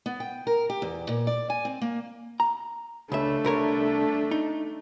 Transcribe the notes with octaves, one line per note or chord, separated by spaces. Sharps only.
B3
G5
A#4
G4
E2
A#2
D5
G#5
C4
A#3
A#5
C#2 A3 D4 E5
C2 A#4 C#5
D#4